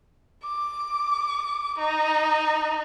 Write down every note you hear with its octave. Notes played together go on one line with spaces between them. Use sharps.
D6
D#4